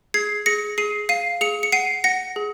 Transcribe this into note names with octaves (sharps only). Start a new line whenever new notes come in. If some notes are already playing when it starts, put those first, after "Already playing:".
G#4 G#6 C7
G#4 A#6 C#7
G#4 C7 D#7
F5 C7 D#7
G#4 C#7 F7
C#7
F#5 C7 D#7
F#5 A#6 C#7
G#4